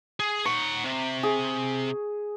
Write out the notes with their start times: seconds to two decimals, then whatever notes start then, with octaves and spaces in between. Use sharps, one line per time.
0.20 G#4
0.45 D#4 F#5 C#6
0.84 C3
1.23 G#4